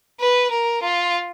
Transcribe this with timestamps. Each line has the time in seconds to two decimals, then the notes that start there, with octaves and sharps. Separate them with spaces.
0.20 B4
0.51 A#4
0.82 F4